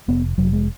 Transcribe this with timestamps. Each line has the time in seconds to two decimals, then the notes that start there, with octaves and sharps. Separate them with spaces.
0.08 F1 B3
0.38 F1 F#3
0.53 G#3